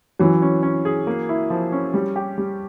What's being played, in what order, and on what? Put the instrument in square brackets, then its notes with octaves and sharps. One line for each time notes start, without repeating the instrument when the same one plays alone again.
[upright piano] E3 F#3 [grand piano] C#4
[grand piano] C#4
C#4
G#4
A#3
E4
F3
C#4
G3
G4
G3